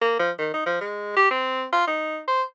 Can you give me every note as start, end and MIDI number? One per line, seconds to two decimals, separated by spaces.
0.01 0.15 58
0.19 0.31 53
0.39 0.50 51
0.54 0.62 63
0.66 0.80 53
0.81 1.15 56
1.16 1.27 67
1.31 1.64 60
1.73 1.87 65
1.87 2.20 63
2.28 2.43 72